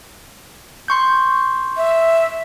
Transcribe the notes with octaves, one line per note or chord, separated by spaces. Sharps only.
C6 C#6 G6
E5